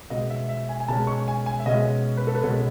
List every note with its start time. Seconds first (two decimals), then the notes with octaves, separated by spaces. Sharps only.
0.10 B2 G#3 C#4 D#5
0.30 E5
0.49 E5
0.69 G#5
0.80 G#5
0.88 B2 G#3 C#4 A5
1.07 C#6
1.28 G#5
1.46 G#5
1.60 E5
1.66 B2 G#3 C#4 D#5
2.17 B4
2.27 A4
2.35 B4
2.43 B2 G#3 C#4 A4